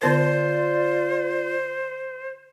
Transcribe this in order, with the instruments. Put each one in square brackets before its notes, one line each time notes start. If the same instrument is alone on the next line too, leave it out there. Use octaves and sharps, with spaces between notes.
[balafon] D3 B3 A#4 [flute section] F4 D5 [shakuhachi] C5